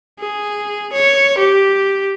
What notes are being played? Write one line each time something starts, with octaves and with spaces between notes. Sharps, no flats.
G#4
C#5
G4